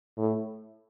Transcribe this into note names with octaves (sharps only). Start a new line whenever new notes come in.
A2